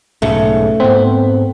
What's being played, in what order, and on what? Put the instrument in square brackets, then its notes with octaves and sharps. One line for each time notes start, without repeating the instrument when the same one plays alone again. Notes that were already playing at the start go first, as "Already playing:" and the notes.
[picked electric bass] B1 G#2 C#3 [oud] A3
[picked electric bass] G#2 B3 [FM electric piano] C4